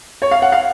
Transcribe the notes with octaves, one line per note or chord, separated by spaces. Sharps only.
C#5
F5
F#5
F5